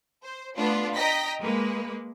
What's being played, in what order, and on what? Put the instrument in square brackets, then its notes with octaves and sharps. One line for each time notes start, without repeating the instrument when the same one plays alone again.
[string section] C5
A3 B3 D4 F4
D#5 G5 A#5 A#6 B6
G#3 A#3 B4